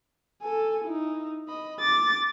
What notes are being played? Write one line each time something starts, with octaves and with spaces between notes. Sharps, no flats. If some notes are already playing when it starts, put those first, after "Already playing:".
A4 G#5
D#4 E4
D#5 B5
D6 A6